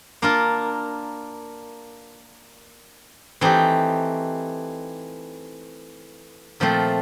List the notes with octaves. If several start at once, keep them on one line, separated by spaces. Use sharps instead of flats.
A#3 D4 F4 A#4
E3 A3 C4 D#4 G4
A#2 F3 A3 C4